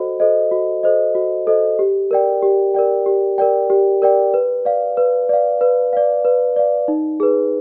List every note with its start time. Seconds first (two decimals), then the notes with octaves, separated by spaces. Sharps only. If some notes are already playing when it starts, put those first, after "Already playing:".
Already playing: F#4 A4 C5 D#5
0.20 A4 C5 D#5
0.52 F#4
0.83 A4 C5 D#5
1.15 F#4
1.47 A4 C5 D#5
1.79 G4
2.11 A#4 D5 G5
2.43 G4
2.74 A#4 D5 G5
3.06 G4
3.38 A#4 D5 G5
3.70 G4
4.02 A#4 D5 G5
4.34 B4
4.65 D5 F5
4.97 B4
5.29 D5 F5
5.61 B4
5.93 D5 F5
6.25 B4
6.56 D5 F5
6.88 D#4
7.20 G#4 B4